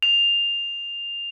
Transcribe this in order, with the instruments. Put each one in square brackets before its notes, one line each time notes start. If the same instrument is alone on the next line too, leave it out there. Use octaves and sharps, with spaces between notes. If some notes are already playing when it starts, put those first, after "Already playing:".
[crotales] F7